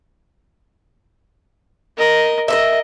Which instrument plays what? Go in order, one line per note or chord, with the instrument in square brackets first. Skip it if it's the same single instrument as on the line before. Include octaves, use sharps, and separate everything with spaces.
[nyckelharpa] A#4 D#5
[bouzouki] A#4 C5 E5 [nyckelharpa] D#5